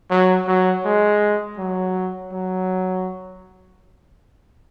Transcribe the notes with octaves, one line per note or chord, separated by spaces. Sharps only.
F#3
F#3
G#3
F#3
F#3